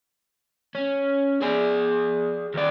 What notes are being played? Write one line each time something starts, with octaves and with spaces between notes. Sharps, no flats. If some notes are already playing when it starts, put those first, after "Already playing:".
C#4
G#4 D5
D#2 D5